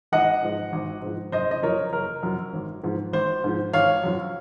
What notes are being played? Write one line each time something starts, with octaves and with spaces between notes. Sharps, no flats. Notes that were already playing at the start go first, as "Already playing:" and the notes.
G#1 D#5 F#5
G#2 F3
G#1
G#2 F3
F#1 C5 D#5
D#5
F#2 F3 A#4 C#5
F#1 A#4
F#2 F3
G#1
G#2 F3
G#1 C5
G#2 F3
G#1 C#5 F5
F#2 F3